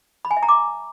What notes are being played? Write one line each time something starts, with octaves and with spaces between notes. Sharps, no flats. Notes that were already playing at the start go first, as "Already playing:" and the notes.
B5
G#5
E5
A#5
D6